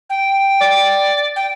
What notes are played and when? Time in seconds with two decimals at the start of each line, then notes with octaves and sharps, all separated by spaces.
0.10 G5
0.61 D5
1.36 G5